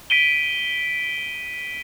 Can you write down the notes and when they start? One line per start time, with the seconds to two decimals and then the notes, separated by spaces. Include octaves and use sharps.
0.10 B6 D7 D#7 G7